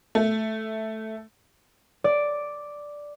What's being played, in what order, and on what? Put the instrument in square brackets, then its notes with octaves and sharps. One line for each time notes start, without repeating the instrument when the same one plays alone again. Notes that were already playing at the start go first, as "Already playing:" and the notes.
[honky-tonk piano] A3
[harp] D5